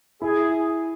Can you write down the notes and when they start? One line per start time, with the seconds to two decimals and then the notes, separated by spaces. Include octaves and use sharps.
0.22 E4 G#4